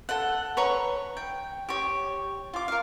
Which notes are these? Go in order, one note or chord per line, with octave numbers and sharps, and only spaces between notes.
A4 F#5
B4 C#5 A#5 C#6
G5
G4 C#5
F4 D6
A#4 F5